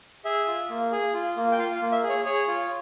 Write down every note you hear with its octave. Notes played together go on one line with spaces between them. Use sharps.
G#4 E5
F4
A#3
G#4
F4
A#3
G5
F4 F5
F5
A#3
E5
G#4
C#5
G#4 C#5
F4